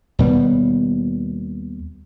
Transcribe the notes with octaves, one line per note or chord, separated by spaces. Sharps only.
D#2 B2 G3 B3